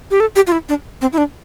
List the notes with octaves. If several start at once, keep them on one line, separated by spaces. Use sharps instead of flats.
G4
A4
G4
F4
E4
D4
C4
E4
D4